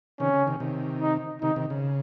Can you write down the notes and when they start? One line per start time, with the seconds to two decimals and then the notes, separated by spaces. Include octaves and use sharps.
0.20 C3 D#3 C#4
0.34 C#3
0.47 C3 D#3
0.60 C3 D#3
1.01 D#4
1.42 C3 D#3 D#4
1.56 C3 D#3
1.70 C#3